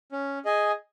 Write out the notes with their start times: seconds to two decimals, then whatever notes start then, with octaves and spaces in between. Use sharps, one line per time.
0.12 C#4
0.45 G#4 D#5 G#5